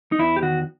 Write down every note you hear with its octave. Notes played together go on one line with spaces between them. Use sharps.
D#4
E2 E4
G4
D#3 F#4